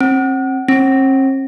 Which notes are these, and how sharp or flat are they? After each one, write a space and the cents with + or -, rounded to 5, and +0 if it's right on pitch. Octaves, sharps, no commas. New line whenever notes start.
C4 +35
C4 +45